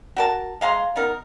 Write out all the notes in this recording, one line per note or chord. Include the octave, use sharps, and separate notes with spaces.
F#4 A#4 A5
G#3 F5 A#5 C6
B3 D#4 A#4